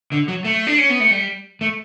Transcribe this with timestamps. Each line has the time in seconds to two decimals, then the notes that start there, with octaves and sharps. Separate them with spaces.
0.12 D3
0.28 F#3
0.45 A3
0.67 D4
0.78 C#4
0.89 B3
1.00 A3
1.11 G3
1.61 A3